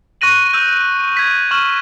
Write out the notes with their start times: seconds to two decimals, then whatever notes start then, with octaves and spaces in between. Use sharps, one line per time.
0.21 C#6 F#6 A#6 D#7 F#7
0.53 E6 G6 D#7
1.17 G#6 B6
1.51 C#6 F6 D#7 E7 F#7